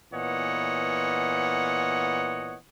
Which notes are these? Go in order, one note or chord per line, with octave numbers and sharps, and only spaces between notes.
A#2 E3 B3 C#5 D#5 F#5